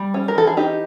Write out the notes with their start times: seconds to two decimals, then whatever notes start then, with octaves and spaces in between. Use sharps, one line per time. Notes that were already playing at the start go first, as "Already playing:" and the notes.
Already playing: G3
0.14 C#4
0.28 A#4
0.35 E3 A4
0.47 G#4
0.57 D#4 G4